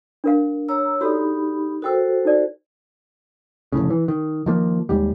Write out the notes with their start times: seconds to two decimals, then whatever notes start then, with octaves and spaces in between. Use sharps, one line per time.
0.24 D4 A#4 F5
0.69 C#5 A#5 E6
1.01 D#4 F#4 G4 A4 D5 B5
1.82 F#4 A4 A#4 C5 G5 E6
2.25 D#4 D5
3.72 F1 A#1 A2 C#3
3.90 E3
4.08 D#3
4.46 D#3 F3 A#3
4.89 D#2 G#2 G3